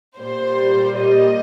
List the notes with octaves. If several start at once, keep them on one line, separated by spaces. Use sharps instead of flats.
A#2 G3 A#3 C5
D#5